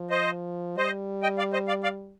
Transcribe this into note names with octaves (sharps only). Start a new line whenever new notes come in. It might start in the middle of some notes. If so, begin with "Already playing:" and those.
Already playing: F3
C5 D#5
G3 C5 D#5
D#5 G5
D5 F5
C5 D#5
D5 F5
D5 F5